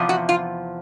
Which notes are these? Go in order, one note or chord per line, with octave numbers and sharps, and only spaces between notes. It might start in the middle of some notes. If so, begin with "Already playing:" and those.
Already playing: E2 C3 F3
F#4
F4